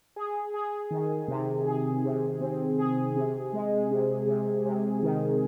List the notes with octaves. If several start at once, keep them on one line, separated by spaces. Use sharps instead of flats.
G#4
G#4
D#3
C3
G#4
C3
C4
G#4
C3
G#3
C3
C3
C3
D#3